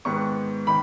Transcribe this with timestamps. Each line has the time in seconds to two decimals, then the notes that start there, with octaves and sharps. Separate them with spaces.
0.05 G#2 D#3 B3 C#6
0.67 D#3 B5